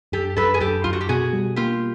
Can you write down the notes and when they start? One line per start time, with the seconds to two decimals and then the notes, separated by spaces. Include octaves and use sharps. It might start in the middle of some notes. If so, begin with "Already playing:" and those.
0.12 F#2 G4 A4
0.37 F#2 A4 B4
0.54 G#4
0.60 F#2 G4 A4
0.84 F#2 F4
0.93 F#4
1.01 G4
1.09 B2 F#4 G#4
1.33 G3
1.56 A#3 F4 G4